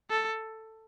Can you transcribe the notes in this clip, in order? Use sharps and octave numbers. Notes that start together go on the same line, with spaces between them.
A4